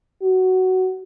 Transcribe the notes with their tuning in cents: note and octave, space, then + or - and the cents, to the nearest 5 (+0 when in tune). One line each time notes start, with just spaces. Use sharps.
F#4 +10